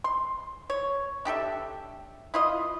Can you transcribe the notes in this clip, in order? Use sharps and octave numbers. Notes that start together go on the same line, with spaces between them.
C6
C#5
D4 G4 A4 E5
E4 F4 D#5